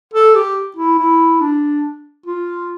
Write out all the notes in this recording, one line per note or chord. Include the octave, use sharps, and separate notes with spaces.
A4
G4
E4
E4
D4
F4